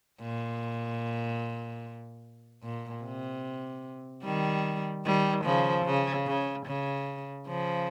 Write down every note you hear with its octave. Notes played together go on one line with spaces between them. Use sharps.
A#2
A#2
C3
D#3 G3
D#3 G3
C#3 F3
C#3
C#3
C#3
C#3 F3